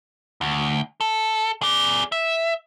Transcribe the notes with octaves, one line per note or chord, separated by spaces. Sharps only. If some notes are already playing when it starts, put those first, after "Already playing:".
D2
A4
G#4 D5
E5